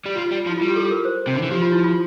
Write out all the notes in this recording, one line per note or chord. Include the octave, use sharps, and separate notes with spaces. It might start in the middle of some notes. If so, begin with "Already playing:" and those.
G3
F3 F4
G3
F3
E4
F4
G3
G4
A4
A#4
C5
C3
D3
E3
F3 G4
F4
E4
F4